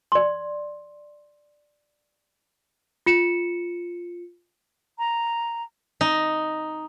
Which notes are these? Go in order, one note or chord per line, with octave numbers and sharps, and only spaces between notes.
D5 C6
F4 C#7 E7
A#5
D#4